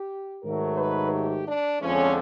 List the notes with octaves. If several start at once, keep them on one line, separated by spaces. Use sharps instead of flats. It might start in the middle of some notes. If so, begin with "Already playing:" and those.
Already playing: G4
G#2 D#3 F#3 A3 A#4
B4
G4
D4
F2 D3 F3 G#3 C#4